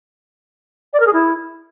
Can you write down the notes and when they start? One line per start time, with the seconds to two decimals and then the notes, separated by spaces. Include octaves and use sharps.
0.93 D5
1.00 A#4
1.07 G#4
1.13 E4